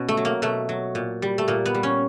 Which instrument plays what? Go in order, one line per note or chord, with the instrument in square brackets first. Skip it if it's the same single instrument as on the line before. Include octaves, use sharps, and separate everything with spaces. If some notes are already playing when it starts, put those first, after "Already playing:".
Already playing: [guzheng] B2 C#4
A3
F#3
A#3
B2 A3
F#3
A#2
G3
A3
A#2 A#3
B3
G3
C#4